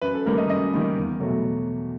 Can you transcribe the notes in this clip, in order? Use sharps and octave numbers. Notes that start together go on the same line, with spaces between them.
F#2 B4
A4
D#3 G3 A#3 A#4
D#5
F#2 D#5
D#3 G3 A#3
E2
B2 F#3 A3